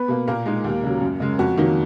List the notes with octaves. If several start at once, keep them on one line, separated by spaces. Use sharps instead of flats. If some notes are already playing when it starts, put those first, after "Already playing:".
Already playing: B3 B4
B2 A#3
A#2 A#3 A#4
G#3 D#4
D#2
C#3 F#3
F#2
C#3 G#3
F2 F#4
D#3 F#3 A#3 D#4